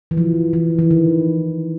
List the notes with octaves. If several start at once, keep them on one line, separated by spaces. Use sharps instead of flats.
E3
F3
E3
E3
D#3